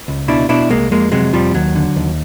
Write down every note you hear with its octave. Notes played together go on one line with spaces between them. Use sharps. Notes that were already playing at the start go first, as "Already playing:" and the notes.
C#2
B2 D4 E4
B2 D4 E4
C2 G#3 A#3
F2 G#3 A#3
C3 F#3 G#3
F2 F3 G3
D#2 F#3
D3
D#2